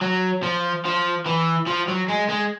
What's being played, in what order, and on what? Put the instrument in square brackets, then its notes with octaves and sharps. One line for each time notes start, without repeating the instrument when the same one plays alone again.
[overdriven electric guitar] F#3
F3
F3
E3
F3
F#3
G#3
G#3